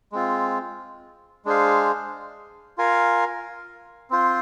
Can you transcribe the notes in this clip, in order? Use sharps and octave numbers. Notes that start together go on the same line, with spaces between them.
G#3 C4 F4
G#3 D4 G#4 C5 F5
F4 A#4 F5 G#5
C4 F4 C5